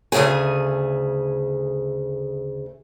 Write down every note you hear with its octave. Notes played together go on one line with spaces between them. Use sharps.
D2 C#3 A3 G#4 G#5